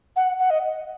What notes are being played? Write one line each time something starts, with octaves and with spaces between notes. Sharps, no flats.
F#5
F#5
D#5